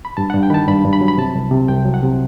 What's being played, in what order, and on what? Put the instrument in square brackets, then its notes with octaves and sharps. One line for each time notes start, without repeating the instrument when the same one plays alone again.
[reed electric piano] B5
G2 A5
G2 F#5
G5
D#3 A5 B5
G2 B5
G2
B5
F#3
B5
C3 A5
C2
C3
C2 G5
F#3
F#5
C3